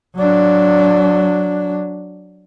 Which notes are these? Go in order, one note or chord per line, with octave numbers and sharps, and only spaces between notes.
F#3 D4